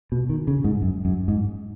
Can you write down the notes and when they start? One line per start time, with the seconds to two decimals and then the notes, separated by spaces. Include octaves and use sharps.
0.12 B2
0.29 D#3
0.47 C#3
0.64 G#2
0.82 F#2
1.05 F#2
1.28 G#2